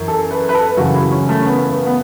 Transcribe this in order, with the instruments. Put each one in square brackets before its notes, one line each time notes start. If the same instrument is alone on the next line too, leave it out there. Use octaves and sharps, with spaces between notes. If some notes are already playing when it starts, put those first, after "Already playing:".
Already playing: [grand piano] F#2 E3
A4
B4
B4
A4
F#2 C#3 E3 F#4
E4
C#4
A3
C#4
B3
B3
B3